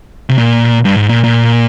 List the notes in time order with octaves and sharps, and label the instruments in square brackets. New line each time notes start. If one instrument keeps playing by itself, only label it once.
[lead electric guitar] C3
A#2
G2
G#2
A#2
A#2